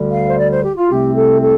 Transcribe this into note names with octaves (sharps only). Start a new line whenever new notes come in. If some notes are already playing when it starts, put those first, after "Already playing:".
Already playing: D2 D3 G3
F5
C5
D5
C5
G4
F4
C2 C3 A3 C4 G4
A4
A4